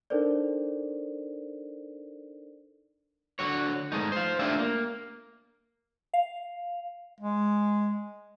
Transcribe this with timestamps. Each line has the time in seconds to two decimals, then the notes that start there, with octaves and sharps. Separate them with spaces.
0.10 D4 D#4 A4 A#4 C5 D5
3.39 D3 F#4 C#5
3.92 G#3 A3 D#4
4.12 C5 F5
4.39 A3 D4 F4 G4 E5
4.59 A#3
6.14 F5
7.20 G#3